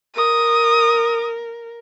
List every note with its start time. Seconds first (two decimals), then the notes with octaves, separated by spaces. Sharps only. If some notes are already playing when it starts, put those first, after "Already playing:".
0.16 A#4 D#6